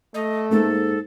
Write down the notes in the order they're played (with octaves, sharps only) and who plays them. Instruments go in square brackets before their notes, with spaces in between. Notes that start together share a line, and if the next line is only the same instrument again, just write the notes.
[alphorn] A3 [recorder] D#5
[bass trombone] G#2 [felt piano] A#3 [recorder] A4